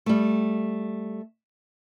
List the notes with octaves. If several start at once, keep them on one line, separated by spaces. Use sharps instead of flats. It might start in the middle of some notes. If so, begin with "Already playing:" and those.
G3 A3